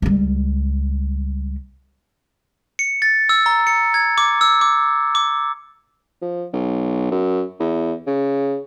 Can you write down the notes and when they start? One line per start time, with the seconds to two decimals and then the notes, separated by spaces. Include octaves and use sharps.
0.02 C#2 G3
2.79 C#7
3.02 A6
3.29 E6
3.46 A#5
3.67 C#7
3.94 G#6
4.18 D6
4.41 E6
4.61 D6
5.15 D6
6.22 F3
6.53 B1
7.11 F#2
7.60 E2
8.07 C#3